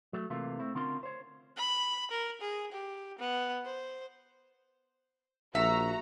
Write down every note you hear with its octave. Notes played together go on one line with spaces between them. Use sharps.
F#3 A3
C3 E3 A3 A#3 F4
A3 C4 E4
D3 C4 C#4 F4 A#4 C6
C5 C#5
B5
A#4
G#4
G4
B3
C5
A#1 F#4 E5 A#5